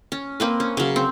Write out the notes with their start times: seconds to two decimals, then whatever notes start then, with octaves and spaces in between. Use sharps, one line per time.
0.12 C#4
0.40 A#3 C4 B4
0.60 C#4
0.77 C#3 F#3
0.96 C4